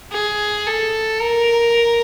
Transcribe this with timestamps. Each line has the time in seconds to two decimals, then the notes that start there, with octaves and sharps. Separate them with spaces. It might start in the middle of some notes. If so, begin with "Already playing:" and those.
0.12 G#4
0.67 A4
1.21 A#4